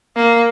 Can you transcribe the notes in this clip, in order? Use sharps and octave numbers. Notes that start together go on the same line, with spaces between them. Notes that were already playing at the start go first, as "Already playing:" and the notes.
A#3